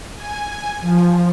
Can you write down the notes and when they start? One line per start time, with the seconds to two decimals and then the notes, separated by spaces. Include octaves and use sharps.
0.16 G#5
0.81 F3